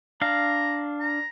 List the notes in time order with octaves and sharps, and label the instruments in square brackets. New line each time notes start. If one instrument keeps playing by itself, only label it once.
[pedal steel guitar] D4 F5 [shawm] A#5
[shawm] A#5